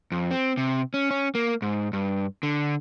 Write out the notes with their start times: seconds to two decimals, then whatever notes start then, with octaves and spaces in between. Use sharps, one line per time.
0.12 F2
0.31 C4
0.57 C3
0.94 C#4
1.11 C#4
1.35 A#3
1.62 G#2
1.93 G2
2.43 D3